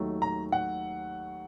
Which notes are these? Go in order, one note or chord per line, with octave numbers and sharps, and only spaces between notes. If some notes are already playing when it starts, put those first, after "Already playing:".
Already playing: D#2 D#3 F#3 A3
A#5
F#5